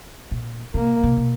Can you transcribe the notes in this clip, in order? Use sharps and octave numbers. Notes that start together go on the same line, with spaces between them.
A#2
C3 A#3
C3
B2